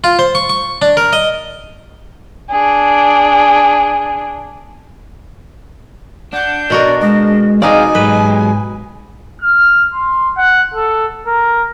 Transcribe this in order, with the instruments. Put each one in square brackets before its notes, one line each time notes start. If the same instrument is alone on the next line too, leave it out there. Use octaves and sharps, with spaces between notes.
[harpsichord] F4
C5
C#6
C#6
D4
A#4
D#5
[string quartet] D4 G#4
[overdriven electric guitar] D4 [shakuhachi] F#5 [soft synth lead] G6
[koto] B2 F#4 A#4 [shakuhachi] D5
[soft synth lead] G#3 [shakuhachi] D#5
[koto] B2 D#4 D5 [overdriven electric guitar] C4 G#4 [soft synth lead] F5 [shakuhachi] G#5
[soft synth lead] G#2 [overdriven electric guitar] F#3 G#3 [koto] B4
[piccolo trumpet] F6
C6
F#5
A4
A#4